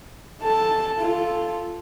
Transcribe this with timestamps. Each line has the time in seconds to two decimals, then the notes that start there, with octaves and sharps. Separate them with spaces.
0.42 A4 A5
0.99 F4 A4